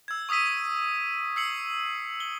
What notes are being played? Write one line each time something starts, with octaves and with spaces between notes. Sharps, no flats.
E6 G#6
C#6 D#6 E6 B6 D#7
E6 C7 C#7 F#7
G7